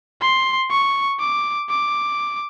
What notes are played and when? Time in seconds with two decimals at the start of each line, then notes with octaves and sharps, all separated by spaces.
0.21 C6
0.71 C#6
1.20 D6
1.70 D6